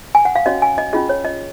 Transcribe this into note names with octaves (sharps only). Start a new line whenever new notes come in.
G#5
F#5
F5
C#4 F#4 C#5 D#5
G#5
D#5
C#4 F4 G#4 D#5
C#5
D#5